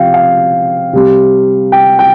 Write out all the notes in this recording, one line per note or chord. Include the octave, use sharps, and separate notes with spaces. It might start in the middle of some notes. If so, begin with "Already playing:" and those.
Already playing: C3 F3 F5 G5
F5
C3 G3
G5
G5